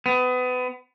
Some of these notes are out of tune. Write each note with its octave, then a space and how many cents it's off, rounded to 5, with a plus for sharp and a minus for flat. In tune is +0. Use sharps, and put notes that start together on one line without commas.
B3 +30